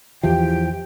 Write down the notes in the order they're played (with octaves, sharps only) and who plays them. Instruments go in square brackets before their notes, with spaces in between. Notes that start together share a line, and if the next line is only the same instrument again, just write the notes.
[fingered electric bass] E2 E3 F3 [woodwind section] G4 G5